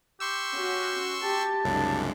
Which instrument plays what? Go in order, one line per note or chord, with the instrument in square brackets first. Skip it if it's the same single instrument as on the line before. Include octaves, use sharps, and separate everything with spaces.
[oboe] G4 [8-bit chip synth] C6 C#6 E6
[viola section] C#4 F#4
[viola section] G4 [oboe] A5
[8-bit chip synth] C2 F#2 C#3 [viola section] G#3 D4